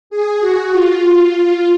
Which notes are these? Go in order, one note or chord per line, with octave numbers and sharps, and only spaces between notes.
G#4
F#4
F4